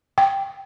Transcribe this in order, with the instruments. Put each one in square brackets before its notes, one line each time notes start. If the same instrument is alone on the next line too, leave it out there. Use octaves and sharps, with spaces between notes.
[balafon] G5